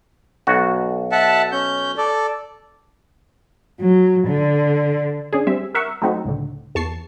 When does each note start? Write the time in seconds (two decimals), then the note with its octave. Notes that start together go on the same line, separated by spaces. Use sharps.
0.47 B1 F#4
1.12 E5 F#5 A5
1.52 C#4 G6
1.97 A4 D5
3.80 F#3
4.27 D3
5.33 C#4 D4 G#4
5.47 G3 C4 E5
5.75 A#4 E5 F#5 C#6
6.02 F#3 A3 C4 D#4 F#4
6.25 C#2 A2 D3
6.75 E2 A5 C#6 C7